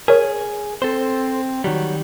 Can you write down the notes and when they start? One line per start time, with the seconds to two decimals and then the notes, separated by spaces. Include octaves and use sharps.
0.08 G#4 A#4 C#5
0.82 C4 A4 C5
1.64 D#3 F#3 G3